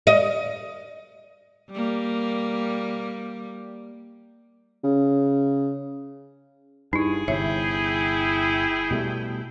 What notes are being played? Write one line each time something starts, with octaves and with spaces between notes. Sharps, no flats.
D#5
G3 A#3
C#3
G2 D#4 E4 G#4
G1 C3 E4 C#5 E5 G5
B2 G3 A3